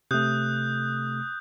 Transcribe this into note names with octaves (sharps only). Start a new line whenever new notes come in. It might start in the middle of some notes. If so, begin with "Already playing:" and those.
C3 A3 D#6 F#6 G6